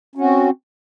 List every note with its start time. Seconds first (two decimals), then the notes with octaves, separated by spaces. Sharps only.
0.15 C#4
0.18 F#4
0.21 C4